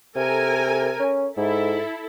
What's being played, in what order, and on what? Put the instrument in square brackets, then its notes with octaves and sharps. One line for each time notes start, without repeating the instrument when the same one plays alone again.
[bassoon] C3 [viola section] A4 A#4 G#5
[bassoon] C#4
[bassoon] G#2 [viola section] E4 A4